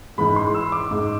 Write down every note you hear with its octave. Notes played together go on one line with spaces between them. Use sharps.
G#2 E3 G#3 B5
C6
E6
D6
G#2 G#3